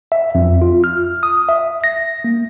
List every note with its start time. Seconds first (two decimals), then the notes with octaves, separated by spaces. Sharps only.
0.12 E5
0.35 F2
0.62 F4
0.84 F6
1.23 D#6
1.49 E5
1.84 A#6
2.24 A#3